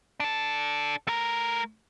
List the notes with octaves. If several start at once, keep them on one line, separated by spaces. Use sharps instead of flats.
D4 A4
A3 A#4